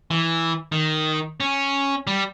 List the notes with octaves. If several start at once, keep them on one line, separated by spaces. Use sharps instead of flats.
E3
D#3
C#4
G3